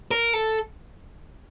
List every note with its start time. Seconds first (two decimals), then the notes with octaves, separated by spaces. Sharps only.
0.11 A#4
0.33 A4